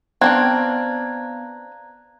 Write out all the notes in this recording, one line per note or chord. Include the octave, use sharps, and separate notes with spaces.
B3 C4 D4 G5 A#5 F#6 G#6